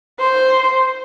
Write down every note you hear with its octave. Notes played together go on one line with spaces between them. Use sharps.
C5